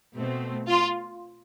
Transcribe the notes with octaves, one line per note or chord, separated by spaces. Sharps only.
B2 A3 C4
F4